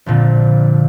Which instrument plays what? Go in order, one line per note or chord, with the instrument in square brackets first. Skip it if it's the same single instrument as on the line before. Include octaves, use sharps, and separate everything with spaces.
[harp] A#1 F2 A#2 D3